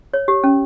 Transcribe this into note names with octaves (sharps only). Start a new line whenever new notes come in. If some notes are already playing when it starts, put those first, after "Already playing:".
C#5
G4
C#4